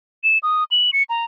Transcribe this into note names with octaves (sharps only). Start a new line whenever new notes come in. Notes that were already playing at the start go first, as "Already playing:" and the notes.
E7
D#6
F#7
C#7
A#5